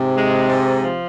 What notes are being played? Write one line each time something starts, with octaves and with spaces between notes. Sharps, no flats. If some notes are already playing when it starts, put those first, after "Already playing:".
Already playing: G#2 C3
G#3
G#2
F3